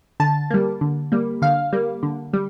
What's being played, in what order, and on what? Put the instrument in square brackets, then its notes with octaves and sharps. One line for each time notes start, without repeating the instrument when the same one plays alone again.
[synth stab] D3 A5
G3 A#3
D3
G3 A#3
D3 F5
G3 A#3
D3
G3